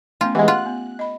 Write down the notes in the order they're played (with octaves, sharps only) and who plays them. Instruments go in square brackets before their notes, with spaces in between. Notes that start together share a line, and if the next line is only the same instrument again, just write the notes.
[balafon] A3 B3 C#4 [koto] F4
[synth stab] E3 G#3 [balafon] G4 D#5 F#5
[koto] F4 [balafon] F#5 [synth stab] F#6
[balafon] B3
D#5 B5